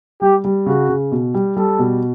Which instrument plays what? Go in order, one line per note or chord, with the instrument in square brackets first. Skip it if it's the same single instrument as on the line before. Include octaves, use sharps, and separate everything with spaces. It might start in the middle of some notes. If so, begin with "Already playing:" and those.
[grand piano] G3 [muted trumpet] G4
[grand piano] G3
[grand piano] C#3 [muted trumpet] F#4
[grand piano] C#3
B2
G3
[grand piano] G3 [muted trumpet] A4
[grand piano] B2